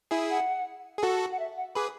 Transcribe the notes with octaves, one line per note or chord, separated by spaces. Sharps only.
E4 G#4
F#5
G#4
F#4 A4
F#5
E5
F#5
G#4 B4 D6